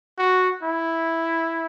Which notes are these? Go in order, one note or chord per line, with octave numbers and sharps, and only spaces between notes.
F#4
E4